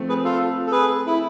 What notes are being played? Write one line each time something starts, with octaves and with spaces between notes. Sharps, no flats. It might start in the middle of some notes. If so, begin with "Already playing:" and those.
Already playing: F3 A3 C4
G#4 B4
F4 A4
A4
G#4 B4
E4